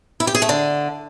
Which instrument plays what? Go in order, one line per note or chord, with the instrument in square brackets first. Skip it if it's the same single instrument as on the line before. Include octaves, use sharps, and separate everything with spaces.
[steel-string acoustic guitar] E4
G4
G#4
A3
D3